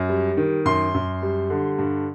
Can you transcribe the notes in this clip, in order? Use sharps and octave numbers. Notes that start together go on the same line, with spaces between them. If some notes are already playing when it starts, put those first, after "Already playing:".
Already playing: F#2
G3
D#3
F#2 C6
F#2
G3
D3
G2